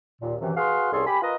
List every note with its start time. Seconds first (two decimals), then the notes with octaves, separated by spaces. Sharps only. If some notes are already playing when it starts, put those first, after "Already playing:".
0.22 D#2 A#2
0.41 F#2 C3 D#3 E3
0.57 F#4 G#4 B4 F5 C6
0.93 C2 C#4 G#4 A4 C6
1.07 G4 G#5 B5
1.22 F4 A#4 B4 D#5